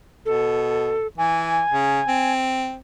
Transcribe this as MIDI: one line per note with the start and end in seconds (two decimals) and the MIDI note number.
0.25 0.97 47
0.25 1.07 69
1.18 1.61 52
1.18 2.33 80
1.71 2.01 49
2.08 2.76 60